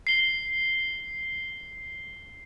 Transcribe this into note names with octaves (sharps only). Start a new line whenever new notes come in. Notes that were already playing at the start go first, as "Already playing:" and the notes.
C7 G7